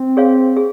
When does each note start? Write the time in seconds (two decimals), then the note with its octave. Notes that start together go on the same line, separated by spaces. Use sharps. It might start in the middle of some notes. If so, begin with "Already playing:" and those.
Already playing: C4
0.17 G#4 C#5 F5
0.57 G#4